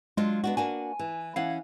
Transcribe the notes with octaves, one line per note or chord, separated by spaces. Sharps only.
F#3 G#3 D4 F4
B3 D4 F#4
A#3 D4 F#4 G#5
E3
E3 C#4 F5 F#5